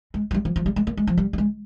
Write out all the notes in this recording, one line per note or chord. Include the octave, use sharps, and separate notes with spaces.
G#3
F3
G3
F3
F3
G3
G#3
A#3
G#3
F3
G3
G3
G#3